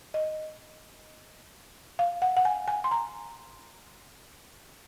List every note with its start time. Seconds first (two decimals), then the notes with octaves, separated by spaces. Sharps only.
0.14 D#5
1.99 F5
2.22 F#5
2.37 F#5
2.45 G#5
2.68 G#5
2.84 C6
2.91 A#5